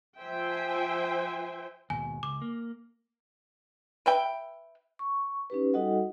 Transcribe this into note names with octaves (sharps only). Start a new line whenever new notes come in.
F3 C5 E5 G5 G#5
D#2 G#2 B2 G#5
C#2 D6
A#3
B4 E5 G5
C#6
C#4 D#4 G4 B4
G3 D#4 F#4 A4 D#5 F#5